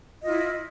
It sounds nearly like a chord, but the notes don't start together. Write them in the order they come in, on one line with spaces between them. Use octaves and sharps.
D#5 F4 E4